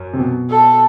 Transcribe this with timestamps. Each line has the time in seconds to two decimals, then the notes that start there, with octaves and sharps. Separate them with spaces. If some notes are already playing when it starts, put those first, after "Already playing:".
Already playing: F#2
0.13 C3
0.19 B2
0.50 A4